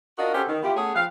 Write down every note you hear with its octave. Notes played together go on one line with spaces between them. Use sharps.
D4 F4 F#4 A#4 D#5
C#4 F#4 G4 A4 B4 C5
D#3
B3 E4 F4 G4
A3 B3 C#4 G#4
F3 C4 B4 F5